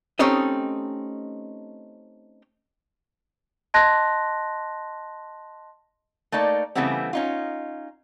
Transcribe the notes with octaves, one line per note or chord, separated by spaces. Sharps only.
A3 C4 C#4 D#4 G4 D#5
D#5 A5 C6 F#6 A#6
A3 A#3 D#4 D5
C#3 E3 G3 A3 B3 C4
C#4 D#4 F4